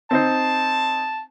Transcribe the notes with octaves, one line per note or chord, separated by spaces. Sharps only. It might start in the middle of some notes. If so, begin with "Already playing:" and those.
C4 D#4 C5 A5